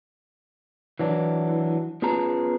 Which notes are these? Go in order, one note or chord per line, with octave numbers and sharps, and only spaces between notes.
E3 F#3 D4
B3 C#4 F4 G#4 A5 A#5